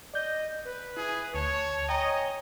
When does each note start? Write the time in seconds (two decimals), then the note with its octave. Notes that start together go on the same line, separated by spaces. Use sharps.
0.14 D5 D#5 G6
0.65 B4
0.97 E4 G#4
1.34 D2 C#5 A5
1.89 C#5 D#5 G5 G#5 A#5